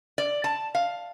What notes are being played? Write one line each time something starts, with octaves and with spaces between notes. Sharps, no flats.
D5
A5
F5